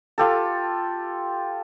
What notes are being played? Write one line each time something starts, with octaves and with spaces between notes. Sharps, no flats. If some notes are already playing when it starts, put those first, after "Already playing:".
F4 G4 A4